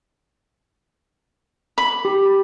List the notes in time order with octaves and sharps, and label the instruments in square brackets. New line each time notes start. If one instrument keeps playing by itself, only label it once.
[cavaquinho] B5
[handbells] G4